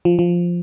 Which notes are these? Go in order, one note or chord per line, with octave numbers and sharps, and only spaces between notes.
F3
F3